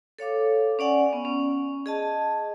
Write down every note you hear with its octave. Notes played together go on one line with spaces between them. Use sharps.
A4 C#5 F5 D6
C#4 D5 F#5 G#5
B3 C#4
C#4
G#4 D#5 A5